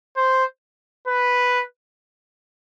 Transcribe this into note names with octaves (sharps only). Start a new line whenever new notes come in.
C5
B4